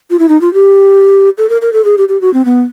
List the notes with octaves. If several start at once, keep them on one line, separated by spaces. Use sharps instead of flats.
F4
E4
D#4
F4
G4
A4
A#4
A#4
A4
G#4
G4
G4
F#4
C4
B3